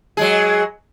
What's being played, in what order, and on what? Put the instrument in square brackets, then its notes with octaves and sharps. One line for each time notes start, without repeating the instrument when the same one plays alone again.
[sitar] F#3 G#3 G#4